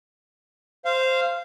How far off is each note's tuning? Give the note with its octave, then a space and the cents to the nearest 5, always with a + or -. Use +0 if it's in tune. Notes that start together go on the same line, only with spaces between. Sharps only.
C5 +0 F5 -15